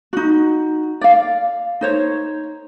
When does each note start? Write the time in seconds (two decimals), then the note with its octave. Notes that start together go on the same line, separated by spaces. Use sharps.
0.13 D#4 F#4
1.01 D5 F5
1.81 D#4 C5 C#5